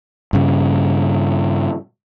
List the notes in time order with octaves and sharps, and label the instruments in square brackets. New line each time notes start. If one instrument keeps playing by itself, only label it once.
[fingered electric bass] G2 C#3